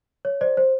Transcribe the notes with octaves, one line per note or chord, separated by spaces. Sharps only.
C#5
C5 D5
C5